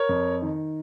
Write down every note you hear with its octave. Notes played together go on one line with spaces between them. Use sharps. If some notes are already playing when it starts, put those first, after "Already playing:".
Already playing: A#4 C#5
F2
D#3